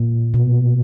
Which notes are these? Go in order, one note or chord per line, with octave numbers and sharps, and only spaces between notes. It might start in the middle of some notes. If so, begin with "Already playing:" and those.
Already playing: A#2
B2